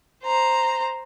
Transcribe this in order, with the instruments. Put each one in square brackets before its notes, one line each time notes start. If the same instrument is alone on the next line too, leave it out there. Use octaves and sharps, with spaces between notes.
[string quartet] C5 A#5